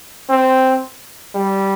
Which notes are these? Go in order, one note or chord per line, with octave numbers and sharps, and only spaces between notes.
C4
G3